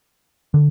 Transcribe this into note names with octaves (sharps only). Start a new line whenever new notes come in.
D3